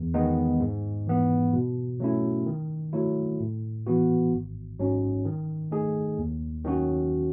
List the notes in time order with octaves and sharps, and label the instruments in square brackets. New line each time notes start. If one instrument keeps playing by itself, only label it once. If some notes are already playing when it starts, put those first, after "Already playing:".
Already playing: [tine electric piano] E2
D#3 G#3 B3 D#4
G#2
E3 B3
B2
F#3 A3 C#4 E4
D#3
F#3 A3 E4
A2
E3 B3 F#4
G#1
G#2 F#3 C#4
D#3
A3 D#4 G#4
D#2
D#3 F#3 C#4 F#4